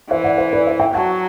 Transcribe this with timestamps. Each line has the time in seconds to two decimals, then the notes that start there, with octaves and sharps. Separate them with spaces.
0.10 E3 C5 E5
0.24 D5 F#5
0.38 C5 E5
0.53 B4 D5
0.67 C5 E5
0.80 E5 G5
0.94 F#3 F#5 A5